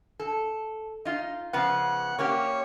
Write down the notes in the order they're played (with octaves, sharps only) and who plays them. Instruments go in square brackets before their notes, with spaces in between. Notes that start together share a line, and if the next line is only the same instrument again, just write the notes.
[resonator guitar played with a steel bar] A4
D#4 F4
[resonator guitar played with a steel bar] C#3 F3 B3 [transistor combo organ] F#5
[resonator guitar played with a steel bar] A#3 C#4 G4 [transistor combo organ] C#5